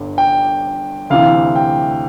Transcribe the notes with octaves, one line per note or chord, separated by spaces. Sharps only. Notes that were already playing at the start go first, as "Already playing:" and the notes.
Already playing: G1 G2 D3
G5
D2 C3 E3 F5
G5